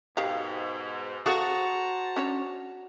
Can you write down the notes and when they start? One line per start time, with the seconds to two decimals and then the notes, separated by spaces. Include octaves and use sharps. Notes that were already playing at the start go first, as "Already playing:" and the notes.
0.17 G#2 B2 D#3 G4 F5
1.26 F#4 G#4 A4 C5 F5 A5 A#5
2.16 C#4 D4 C#5